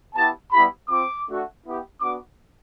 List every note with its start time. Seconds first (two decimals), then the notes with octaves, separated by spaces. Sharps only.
0.14 B3 E4 G4 A5
0.51 G3 B3 E4 G4 B5
0.89 C4 F4 D6
1.27 A3 D4 F#4
1.64 B3 E4 G4
2.01 B3 D4 F#4 D6